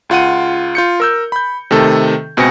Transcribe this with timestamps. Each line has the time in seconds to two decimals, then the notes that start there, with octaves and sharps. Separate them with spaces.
0.09 C#2 F4 F#5 D#7
0.75 F4 G6 C#7
1.00 A#4 E6 G6
1.32 B5 G6
1.71 C3 D#3 A3 A4
2.37 C#2 B2 C4 G#5 A#6 C#7